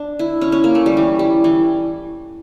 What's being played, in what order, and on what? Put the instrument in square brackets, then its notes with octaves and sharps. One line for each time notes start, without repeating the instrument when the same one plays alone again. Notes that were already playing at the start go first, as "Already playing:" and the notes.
Already playing: [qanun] D4
E4
C#4
C#4
A#3
A3
G3
E3
G3
E3